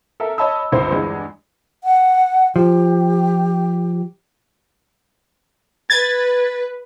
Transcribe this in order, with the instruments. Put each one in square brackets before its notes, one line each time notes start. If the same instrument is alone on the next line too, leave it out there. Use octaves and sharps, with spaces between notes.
[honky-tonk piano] A4 A#4 E5
C#5 D#5 A5 B5 E6
G1 C#2 C5
E2 G2 G#3
[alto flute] F#5
[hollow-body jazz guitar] F3 [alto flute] G4
[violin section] B4 [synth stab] G#6 A6